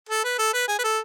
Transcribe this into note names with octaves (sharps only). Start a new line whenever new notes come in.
A4
B4
A4
B4
G#4
B4
A4